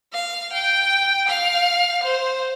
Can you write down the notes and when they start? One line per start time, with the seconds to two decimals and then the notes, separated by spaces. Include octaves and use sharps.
0.13 F5
0.52 G5
1.28 F5
2.03 C5